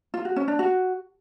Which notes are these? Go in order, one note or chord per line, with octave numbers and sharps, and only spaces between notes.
F4
F#4
C#4
D4
F#4